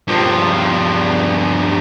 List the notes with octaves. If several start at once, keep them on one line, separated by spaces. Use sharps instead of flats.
G2 F3